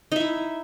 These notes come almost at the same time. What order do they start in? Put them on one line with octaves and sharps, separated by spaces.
D#4 E5 E4